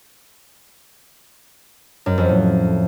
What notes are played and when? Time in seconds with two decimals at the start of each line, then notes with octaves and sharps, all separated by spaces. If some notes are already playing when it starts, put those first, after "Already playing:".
2.06 F#2
2.18 F2
2.29 A2